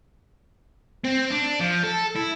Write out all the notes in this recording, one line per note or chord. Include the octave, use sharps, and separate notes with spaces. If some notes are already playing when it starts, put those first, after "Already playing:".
C4
D4
F3
A4
E4